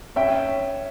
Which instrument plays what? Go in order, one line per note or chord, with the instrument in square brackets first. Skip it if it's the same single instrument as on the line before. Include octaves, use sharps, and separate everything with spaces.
[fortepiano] C#4 E5 G5